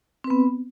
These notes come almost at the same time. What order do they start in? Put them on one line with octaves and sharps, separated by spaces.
C4 B4 B3